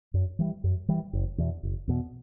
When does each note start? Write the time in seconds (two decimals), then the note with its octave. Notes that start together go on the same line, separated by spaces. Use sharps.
0.14 F#2
0.39 E3 G3
0.64 F#2
0.89 E3 G3
1.13 F#1
1.38 E2 B2
1.63 F#1
1.88 E2 B2